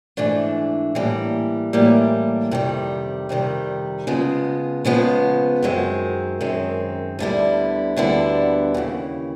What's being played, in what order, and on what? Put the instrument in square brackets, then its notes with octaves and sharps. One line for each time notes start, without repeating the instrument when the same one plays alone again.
[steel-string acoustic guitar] G#2 E3 A3 D4
A2 E3 G3 A#3
A2 E3 G3 A#3
F2 C3 D#3 G3
F2 C3 D#3 G3
C#3 F3 G#3 B3
C#3 F3 G#3 B3
F#2 D#3 G#3 C4
F#2 D#3 G#3 C4
D2 D3 G3 B3 E4
D2 D3 G3 B3 E4
D#2 C#3 E3